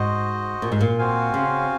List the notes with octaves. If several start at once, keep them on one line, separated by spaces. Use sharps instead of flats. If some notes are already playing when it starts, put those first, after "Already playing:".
Already playing: G#2 F#4 C5 D#5
A#2
G#2
A#2
C4 F#4 C5 F5 G#5
C#3